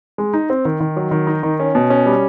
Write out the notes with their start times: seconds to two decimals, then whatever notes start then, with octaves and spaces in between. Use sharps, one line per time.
0.18 G#3
0.34 D#4
0.50 C4
0.65 D#3
0.80 D#3
0.97 F#3
1.11 D#3
1.27 D#4
1.43 D#3
1.60 C#4
1.75 B2
1.90 C#4
2.06 G3